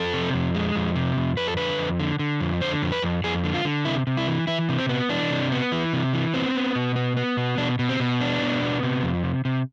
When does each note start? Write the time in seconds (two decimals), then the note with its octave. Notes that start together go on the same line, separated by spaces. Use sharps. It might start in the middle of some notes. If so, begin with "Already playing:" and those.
Already playing: F2 A4
0.13 C3
0.34 F2
0.55 G#3
0.76 F2
0.96 C3
1.17 F2
1.37 F2 B4
1.48 A4
1.57 D3 B4
1.78 F2
2.00 D3
2.19 D3
2.40 F2
2.61 D3 C5
2.82 F2
2.92 B4
3.02 F2
3.24 F2 G#4
3.44 D3
3.54 F4
3.65 D3
3.85 C3 E4
4.07 C3
4.17 E4
4.28 E3
4.47 E3 E4
4.69 C3
4.79 C4
4.89 B3
5.09 E3 D4
5.30 C3
5.52 B3
5.72 E3
5.93 C3
6.13 E3
6.34 B3 C4
6.55 B3
6.75 B2
6.96 B3
7.17 B3
7.37 B2
7.58 B2 D4
7.79 B2
7.89 C4
8.00 B2
8.21 B3 D4
8.41 B2
8.62 B3
8.83 C3
9.03 F2
9.23 C3
9.45 C3